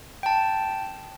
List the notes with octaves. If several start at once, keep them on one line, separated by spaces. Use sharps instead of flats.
G5 A5